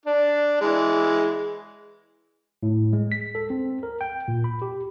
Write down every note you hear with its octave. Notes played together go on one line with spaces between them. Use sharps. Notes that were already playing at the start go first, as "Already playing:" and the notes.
D4
E3 G#3
A2
G#3
B6
A4
C4
A#4
G5
A#2
B5
G4